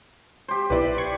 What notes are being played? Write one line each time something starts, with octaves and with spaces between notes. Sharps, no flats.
G4 C5
B1 E4 B4 D5
C#6 G#6 C7